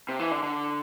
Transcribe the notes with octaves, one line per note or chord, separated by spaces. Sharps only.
C3
E3
D3
D3